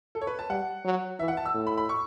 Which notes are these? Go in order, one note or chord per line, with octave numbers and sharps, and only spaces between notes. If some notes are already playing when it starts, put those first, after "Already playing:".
A4
C#5
B4
A5
G3 F#5
F#3
E3 E5
F#5
A5
E6
A2
B5
B5
C#6